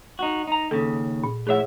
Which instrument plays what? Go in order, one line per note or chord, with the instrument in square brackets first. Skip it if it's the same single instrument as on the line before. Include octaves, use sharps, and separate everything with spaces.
[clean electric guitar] D#4 F#4
D#4 A#5
[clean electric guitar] D#2 C#3 [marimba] A4
[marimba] A#2
[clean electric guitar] A2 F3 E5 [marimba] G#4 C#5 F#5